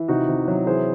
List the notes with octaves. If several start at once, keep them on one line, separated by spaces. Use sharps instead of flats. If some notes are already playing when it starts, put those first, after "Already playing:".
Already playing: E3
C3 D#4 F#4
C3
F#3
E3 G#4 C5